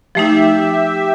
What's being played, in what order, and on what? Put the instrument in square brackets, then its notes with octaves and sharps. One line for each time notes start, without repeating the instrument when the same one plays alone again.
[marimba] F3 A3 D#4 [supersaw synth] G4 E5